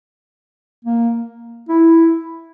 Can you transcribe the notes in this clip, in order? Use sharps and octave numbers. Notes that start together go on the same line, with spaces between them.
A#3
E4